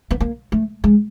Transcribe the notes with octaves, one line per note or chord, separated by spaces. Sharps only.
B3
A#3
A3
G#3